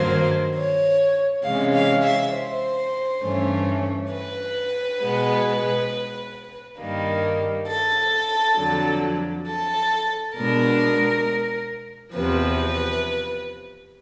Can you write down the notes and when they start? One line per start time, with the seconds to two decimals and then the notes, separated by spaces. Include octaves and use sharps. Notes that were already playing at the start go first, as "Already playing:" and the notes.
Already playing: G2 D#3 F#3 A#3 C5
0.55 C#5
1.43 C3 E3 G#3 C#4 F5
1.74 F5
2.03 E5
2.33 C5
3.22 G2 E3 A3 C#4
4.11 B4
5.00 B2 G#3 B3
6.79 G2 D#3 G3 A#3
7.68 A4
8.57 F2 D3 F#3
9.46 A4
10.35 B2 G#3 B3 D4 A#4
12.14 E2 C3 F3 B4